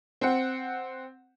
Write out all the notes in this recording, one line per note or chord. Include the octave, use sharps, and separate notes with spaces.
C4 F#5